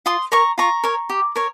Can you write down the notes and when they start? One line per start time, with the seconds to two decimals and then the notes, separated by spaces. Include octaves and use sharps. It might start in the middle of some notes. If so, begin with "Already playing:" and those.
0.06 F4 C6 D#6
0.32 A#4 C#5 A#5 C#6
0.58 F4 A#5 C#6
0.84 A#4 C#5
1.10 G4
1.36 A#4 C#5